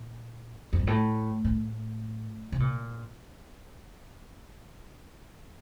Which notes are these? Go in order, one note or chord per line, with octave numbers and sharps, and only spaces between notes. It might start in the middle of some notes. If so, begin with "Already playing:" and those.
Already playing: A#2
F2
G2
A2
A2
C3
A#2